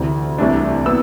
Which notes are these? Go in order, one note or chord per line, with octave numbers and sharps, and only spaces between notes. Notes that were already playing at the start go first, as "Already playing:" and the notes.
Already playing: D2 C3 E3
C2 C3 E3 A3 D4
B3 E6